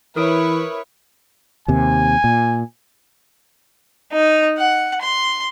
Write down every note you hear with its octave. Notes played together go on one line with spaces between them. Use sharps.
E3 E4 A#4 B4 C#5 D#6 D7
D#2 C3 G#5
A#2
D#4
F#5
C6